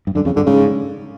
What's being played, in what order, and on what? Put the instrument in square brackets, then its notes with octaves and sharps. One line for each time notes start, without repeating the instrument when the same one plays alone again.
[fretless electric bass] G2
[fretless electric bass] F#2 [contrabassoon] D3
[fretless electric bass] F2 [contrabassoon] C#3
[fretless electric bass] G2 [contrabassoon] D3
[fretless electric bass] G#2 [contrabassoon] C#3